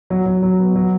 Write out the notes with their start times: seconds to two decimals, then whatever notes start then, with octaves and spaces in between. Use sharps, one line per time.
0.10 F#3
0.26 F#3
0.43 F#3
0.59 B3
0.76 F#3